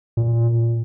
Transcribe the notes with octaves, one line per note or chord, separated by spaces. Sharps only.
A#2